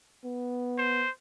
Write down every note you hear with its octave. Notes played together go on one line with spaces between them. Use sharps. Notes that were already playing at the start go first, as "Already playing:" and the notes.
B3
C5